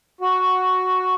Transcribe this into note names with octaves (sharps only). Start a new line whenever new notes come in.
F#4